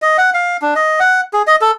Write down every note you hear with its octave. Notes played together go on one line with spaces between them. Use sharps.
D#5
F#5
F5
D4
D#5
F#5
G#4
D#5
A4